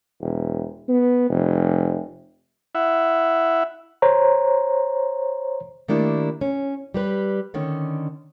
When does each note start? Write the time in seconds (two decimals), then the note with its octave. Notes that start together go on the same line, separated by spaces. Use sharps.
0.21 E1
0.88 B3
1.29 F1
2.75 E4 E5 F#5
4.02 C5 C#5 A#5
5.88 D#3 A3 A#3 D4 E4 G4
6.41 C#4
6.94 G3 G4 B4
7.54 D3 D#3 C#4